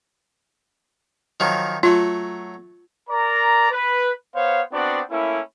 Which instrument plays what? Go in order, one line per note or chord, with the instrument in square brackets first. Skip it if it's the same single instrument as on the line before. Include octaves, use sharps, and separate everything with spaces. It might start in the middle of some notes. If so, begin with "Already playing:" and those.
[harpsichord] D#3 F3 F#3
[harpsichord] F#3 A3 [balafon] F4
[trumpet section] A#4 D5 A#5
B4
B3 C5 C#5 F5
B3 C4 D4 F#4 D5
A3 A#3 C#4 E4